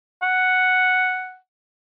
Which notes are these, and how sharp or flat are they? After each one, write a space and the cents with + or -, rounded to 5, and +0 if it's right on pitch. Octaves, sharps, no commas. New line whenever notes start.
F#5 +0